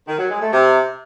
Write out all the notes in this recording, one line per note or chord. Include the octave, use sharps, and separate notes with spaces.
D#3
F#3
G#3
A3
C3